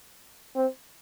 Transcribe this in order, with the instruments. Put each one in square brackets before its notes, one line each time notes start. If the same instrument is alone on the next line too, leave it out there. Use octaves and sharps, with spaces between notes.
[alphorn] C4